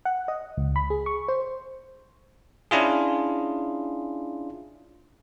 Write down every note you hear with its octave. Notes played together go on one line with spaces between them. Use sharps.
F#5
D#5
C#2
B5
G#4
C#6
C5
C#4 D4 E4 F4 G#4